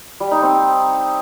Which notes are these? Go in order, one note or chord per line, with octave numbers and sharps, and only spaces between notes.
G3
D#4
C4